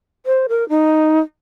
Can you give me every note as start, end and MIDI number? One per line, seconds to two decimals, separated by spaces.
0.26 0.46 72
0.49 0.68 70
0.69 1.19 63